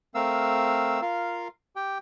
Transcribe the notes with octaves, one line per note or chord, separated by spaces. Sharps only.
A3 C4 A#4 F5 E6
F4 A#4 F5
G4 G5